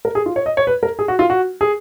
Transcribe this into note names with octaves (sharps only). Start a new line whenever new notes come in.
A#4
G#4
F4
C#5
D#5
C#5
B4
A#4
G#4
F#4
F4
F#4
G#4